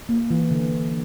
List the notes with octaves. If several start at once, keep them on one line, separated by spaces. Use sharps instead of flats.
A#3
E3
D3